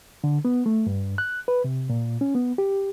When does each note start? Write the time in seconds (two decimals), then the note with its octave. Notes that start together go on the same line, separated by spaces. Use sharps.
0.24 D3
0.45 B3
0.66 A3
0.87 G2
1.18 F#6
1.48 B4
1.64 C3
1.89 A#2
2.21 C#4
2.35 B3
2.58 G4